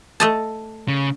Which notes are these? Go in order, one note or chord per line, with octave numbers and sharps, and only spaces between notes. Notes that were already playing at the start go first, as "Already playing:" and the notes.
A3 D#5 A5
C#3